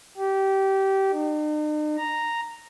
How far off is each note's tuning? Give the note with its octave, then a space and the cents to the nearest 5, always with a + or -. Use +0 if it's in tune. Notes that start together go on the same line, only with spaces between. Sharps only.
G4 -20
D#4 -45
A#5 -5